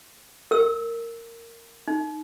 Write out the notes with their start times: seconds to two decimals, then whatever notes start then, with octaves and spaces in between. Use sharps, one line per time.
0.51 A#4 E6
1.88 D#4